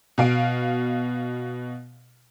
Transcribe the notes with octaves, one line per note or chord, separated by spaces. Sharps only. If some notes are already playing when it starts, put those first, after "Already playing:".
B2 F5 D7